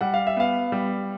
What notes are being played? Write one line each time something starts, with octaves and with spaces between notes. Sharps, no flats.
G3 F#5
F5
E5
B3 F5
G3